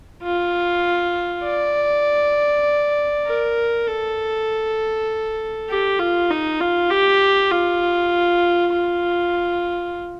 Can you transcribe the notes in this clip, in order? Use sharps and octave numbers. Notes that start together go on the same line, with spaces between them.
F4
D5
A#4
A4
G4
F4
D#4
F4
G4
F4
F4